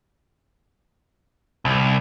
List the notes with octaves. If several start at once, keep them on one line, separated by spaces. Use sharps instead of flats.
C2